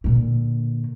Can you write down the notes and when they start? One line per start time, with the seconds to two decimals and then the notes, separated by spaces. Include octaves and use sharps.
0.04 A#2 D3